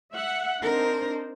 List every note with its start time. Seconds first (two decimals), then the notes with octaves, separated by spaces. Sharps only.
0.12 E5 F#5
0.62 C4 D4 D#4 A#4 C5